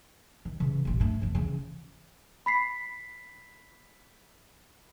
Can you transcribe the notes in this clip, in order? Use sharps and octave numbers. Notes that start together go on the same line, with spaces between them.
D#3
C#3 E3
D#1 A1
G2 A3
F1 E3
C#3 E3
B5 B6 C7